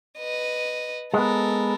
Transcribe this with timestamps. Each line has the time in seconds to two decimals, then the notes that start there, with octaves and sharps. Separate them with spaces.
0.19 B4 D#5
1.14 G#3 B3 A4 A#4